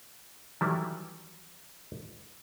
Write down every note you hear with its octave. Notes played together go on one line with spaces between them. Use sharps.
D#3 E3 F#3 G3 A3 E4